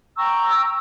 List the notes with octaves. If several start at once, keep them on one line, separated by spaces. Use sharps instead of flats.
G5 A#5 C#6 E6